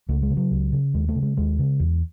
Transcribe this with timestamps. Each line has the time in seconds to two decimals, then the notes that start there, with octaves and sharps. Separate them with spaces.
0.09 C#2 A3
0.23 G#3
0.30 C#3
0.37 F#3
0.51 C#2
0.72 C#3
0.94 D#2 G#3
1.08 A3
1.15 C#3
1.23 G#3
1.37 D#2 G#3
1.59 C#3
1.80 E2